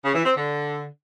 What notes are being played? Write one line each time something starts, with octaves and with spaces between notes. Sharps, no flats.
C#3
E3
C4
D3